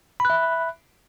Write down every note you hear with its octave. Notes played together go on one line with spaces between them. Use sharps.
E5 B5 F#6